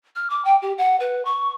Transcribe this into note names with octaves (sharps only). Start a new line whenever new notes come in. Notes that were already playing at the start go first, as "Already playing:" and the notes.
F6
D6
G5
G4
F#5
B4
C#6